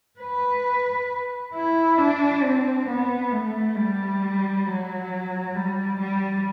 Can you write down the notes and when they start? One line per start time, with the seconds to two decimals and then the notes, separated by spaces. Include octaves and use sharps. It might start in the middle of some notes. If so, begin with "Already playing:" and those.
0.20 B4
1.54 E4
1.98 D4
2.43 C4
2.87 B3
3.32 A3
3.76 G3
4.66 F#3
5.56 G3
6.00 G3